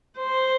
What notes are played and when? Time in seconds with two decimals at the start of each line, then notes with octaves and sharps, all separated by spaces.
0.18 C5